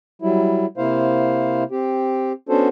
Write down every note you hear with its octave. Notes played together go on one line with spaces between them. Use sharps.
F#3 G3 E4
C3 A#3 E4 C5 F5
C4 G4
B3 C#4 D4 F#4 A4 C5